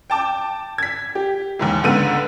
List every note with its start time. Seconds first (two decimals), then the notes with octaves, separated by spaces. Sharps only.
0.10 G5 A5 D6
0.78 G#6 B6
1.15 G4
1.59 D#2 G#2 E3
1.83 C#2 G#2 D3 B3 D#7